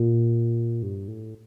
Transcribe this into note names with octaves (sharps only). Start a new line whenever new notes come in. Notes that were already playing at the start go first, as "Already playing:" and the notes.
Already playing: A#2
G2
A2